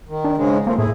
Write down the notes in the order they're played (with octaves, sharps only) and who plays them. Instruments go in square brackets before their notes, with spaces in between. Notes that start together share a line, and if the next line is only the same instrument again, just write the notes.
[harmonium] D#3
[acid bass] D4
[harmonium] G#2 C#3 G#3
[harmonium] F3 A3 C4 [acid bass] A#3
[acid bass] A2 [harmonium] E4 G#4